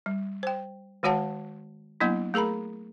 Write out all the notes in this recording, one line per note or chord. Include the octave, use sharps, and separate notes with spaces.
G3
C5 G5
D#3 G#3 F#4 C#5 F#5 A5
F#3 A#3 B3 D4 E4
A3 G#4 A#4 A#5 B5